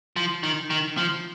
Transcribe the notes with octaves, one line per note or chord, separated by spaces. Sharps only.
F3
D#3
D#3
F3